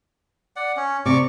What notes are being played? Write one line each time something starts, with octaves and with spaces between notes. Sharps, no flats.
D5 F#5
C#4
C3 D5 C#6 D6